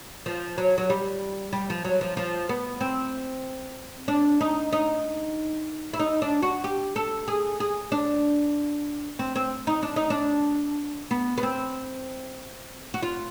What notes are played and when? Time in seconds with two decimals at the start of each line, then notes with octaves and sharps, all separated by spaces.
0.26 F3
0.58 F#3
0.78 F#3
0.90 G3
1.53 G3
1.70 F3
1.85 F#3
2.01 F3
2.17 F3
2.49 B3
2.81 C4
4.08 D4
4.41 D#4
4.73 D#4
5.93 E4
6.00 D#4
6.22 D4
6.42 F#4
6.64 G4
6.96 A4
7.28 G#4
7.60 G#4
7.92 D4
9.19 C4
9.36 C4
9.67 D#4
9.83 D4
9.96 D#4
10.10 D4
11.11 B3
11.38 B3
11.43 C4
12.94 F#4
13.02 F4